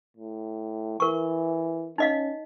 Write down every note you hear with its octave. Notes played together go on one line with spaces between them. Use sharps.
A2
E3 A#4 C#6
C#4 D#4 D#5 F5